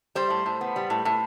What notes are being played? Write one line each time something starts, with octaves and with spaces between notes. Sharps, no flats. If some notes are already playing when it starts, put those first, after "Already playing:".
G3 C5
A2
A2
B3
G3
A2
A2